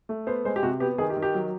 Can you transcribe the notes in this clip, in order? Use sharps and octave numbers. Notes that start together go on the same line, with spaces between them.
A3
B3 C5
G#3 C5
G4
C3 F#4
B3 G4
D#3 G#4
G4
D#3
G4
F#3